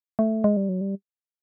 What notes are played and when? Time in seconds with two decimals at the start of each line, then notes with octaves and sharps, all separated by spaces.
0.19 A3
0.44 G#3
0.57 G3
0.69 F#3
0.81 G3